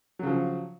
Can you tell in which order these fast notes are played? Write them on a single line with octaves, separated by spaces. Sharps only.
F#3 C#3 F3